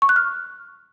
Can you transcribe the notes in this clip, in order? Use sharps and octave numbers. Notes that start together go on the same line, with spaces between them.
C#6
F#6
F6